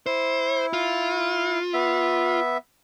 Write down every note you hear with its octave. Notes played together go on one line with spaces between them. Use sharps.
E4 C5
F4
B3 E5